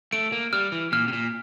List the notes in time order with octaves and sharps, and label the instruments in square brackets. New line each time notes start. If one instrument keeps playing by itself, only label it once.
[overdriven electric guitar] A3 [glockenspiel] D7
[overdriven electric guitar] A#3
[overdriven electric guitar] G3 [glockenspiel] F6
[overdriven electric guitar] E3
[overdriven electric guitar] A#2 [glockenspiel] F6
[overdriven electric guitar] C3
A#2